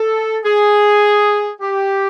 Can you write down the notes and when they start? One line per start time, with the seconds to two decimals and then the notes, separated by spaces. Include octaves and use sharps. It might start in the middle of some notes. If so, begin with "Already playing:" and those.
Already playing: A4
0.44 G#4
1.61 G4